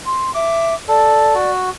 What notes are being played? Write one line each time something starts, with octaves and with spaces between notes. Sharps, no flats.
C6
E5 D6
A4 D5
F#4